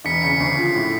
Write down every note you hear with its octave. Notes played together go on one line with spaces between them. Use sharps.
E1 B6 C#7
C#3 B6 C#7
D2 C7
F3
A2